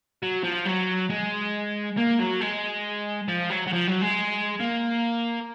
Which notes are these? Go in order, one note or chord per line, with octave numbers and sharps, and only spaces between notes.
F#3
F3
F#3
G#3
A#3
F#3
G#3
F3
F#3
F#3
F3
F#3
G#3
A#3